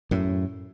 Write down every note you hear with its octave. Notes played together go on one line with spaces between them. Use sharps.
F#2 A2